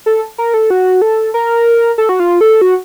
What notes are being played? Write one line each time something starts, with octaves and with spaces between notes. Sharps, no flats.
A4
A#4
A4
F#4
A4
A#4
A4
F#4
F4
A4
F#4